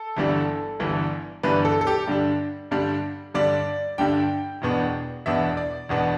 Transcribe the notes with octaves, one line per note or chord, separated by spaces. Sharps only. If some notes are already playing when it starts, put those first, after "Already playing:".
Already playing: A4
G1 G2 E3 G3 D4
G1 G2 E3 G3 D4
G1 G2 E3 G3 D4 B4
A4
A4
G4
G2 D3 G3 D4
G2 D3 G3 D4
G2 D3 G3 D4 D5
G2 D3 G3 D4 G5
E1 E2 B2 B3 D4
E1 E2 B2 B3 D4 E5
D5
E1 E2 B2 B3 D4